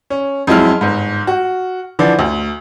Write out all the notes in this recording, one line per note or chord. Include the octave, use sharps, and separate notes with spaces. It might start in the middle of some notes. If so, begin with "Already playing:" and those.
C#4
F2 F#3 G#3 E4 F6
G1 G#2
F#4
D3 E3 F3 D5
D2